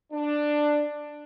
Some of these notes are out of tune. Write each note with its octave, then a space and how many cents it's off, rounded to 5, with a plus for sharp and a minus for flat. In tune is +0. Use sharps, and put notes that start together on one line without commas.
D4 +10